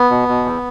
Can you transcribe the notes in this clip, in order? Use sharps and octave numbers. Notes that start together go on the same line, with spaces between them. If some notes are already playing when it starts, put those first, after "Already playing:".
Already playing: B3
B2
B2
E2